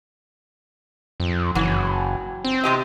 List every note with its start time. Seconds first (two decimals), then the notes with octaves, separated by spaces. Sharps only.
1.20 F2
1.55 F#1 E3 F#3 F#4
2.44 C4
2.64 C3 G4 D#5